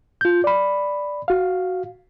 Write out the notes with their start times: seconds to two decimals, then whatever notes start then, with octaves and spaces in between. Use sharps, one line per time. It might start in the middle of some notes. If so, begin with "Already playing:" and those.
0.21 F4 G6
0.44 D5 B5
1.28 F#4 F5